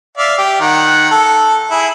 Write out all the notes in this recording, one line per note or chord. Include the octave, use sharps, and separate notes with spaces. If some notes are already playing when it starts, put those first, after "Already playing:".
D5 E5 F5
G4
D#3 F#5
A4
E4 G#4